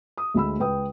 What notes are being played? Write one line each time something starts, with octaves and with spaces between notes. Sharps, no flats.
D#6
D2 G#3 B5 E6
C#2 B4 G5 D#6